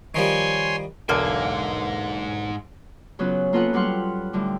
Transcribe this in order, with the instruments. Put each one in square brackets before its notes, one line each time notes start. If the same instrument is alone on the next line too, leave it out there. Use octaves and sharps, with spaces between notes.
[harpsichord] D#3 F3 G3 [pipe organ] C#5 G#5 C6
[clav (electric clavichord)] B1 E2 D3 [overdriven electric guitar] G#2 G#5 [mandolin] A#3
[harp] C#3 F#3 B3 C#4 F4
A#3 B3 F4 A4 B4 F#5
F#3 G3 B4 F#5 C6 F6
A2 D3 G3